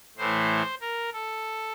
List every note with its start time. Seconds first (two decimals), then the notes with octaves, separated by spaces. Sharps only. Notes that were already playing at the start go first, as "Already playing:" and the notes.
0.17 A2 E3 A3 C5
0.81 A#4
1.13 A4